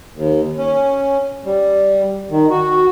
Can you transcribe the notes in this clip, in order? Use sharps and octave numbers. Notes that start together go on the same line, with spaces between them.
D#2
C#4
G3
D#3
F#4